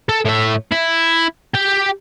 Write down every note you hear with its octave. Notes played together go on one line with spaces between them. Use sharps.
A4
A2 E5
E4
G4 G5